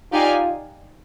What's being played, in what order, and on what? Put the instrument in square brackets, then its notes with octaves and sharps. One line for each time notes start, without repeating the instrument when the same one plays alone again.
[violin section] D#4 G4 D5 F5 G#5 [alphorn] F4